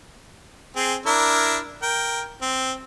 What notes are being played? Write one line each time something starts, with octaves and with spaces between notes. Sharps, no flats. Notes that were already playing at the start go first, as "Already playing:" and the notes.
C4 G#4
D4 E4 A#4
A#4 G5
C4